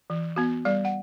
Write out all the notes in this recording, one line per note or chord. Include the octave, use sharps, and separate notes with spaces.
E3
B3 F#4
G3 D5
F#5